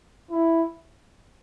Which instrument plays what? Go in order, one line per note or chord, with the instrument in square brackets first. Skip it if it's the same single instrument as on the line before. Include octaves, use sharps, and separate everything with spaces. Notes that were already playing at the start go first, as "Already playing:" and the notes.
[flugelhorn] E4